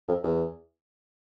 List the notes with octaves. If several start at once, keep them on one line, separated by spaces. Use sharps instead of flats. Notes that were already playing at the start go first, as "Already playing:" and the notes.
F2
E2